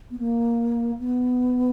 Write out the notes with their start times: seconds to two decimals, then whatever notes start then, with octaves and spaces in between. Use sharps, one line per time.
0.11 B3
0.19 A#3
0.99 B3